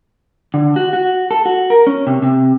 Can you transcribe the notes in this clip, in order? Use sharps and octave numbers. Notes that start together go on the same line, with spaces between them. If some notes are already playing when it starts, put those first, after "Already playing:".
D3
F#4
F#4
A4
F#4
A#4
C#4
C3
C3